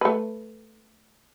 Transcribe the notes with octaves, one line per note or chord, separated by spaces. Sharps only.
A3 B4